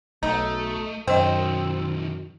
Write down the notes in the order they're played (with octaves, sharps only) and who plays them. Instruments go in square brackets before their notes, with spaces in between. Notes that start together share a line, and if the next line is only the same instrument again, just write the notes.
[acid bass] B1 [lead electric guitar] A3 [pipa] D#4
[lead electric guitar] B1 D#3 [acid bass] F#2 [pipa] C4 [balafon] C5 D#5